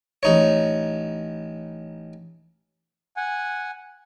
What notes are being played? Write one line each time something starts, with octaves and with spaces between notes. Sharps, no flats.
A1 D#4 C#5
F#5 G#5